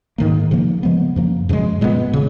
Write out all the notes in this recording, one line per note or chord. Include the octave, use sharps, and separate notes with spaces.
G#2 D#3 A#3
C#3 F3 A#3
C#3 F3 G#3 B3
F#2 F3 A#3
F#2 C#3 F3 G#3
A#2 G#3 B3
C#3